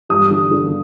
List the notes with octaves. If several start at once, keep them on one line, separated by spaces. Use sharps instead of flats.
G2 D#6
D3
D3